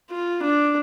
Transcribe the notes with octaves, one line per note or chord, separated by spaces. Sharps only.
F4
D4